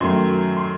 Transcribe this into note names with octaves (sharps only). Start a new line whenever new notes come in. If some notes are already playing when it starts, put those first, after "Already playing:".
F#2 D#3 F#3 A3 C6
C6